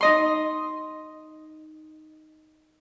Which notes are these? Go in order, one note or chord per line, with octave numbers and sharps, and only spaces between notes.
D#4 D#5 C6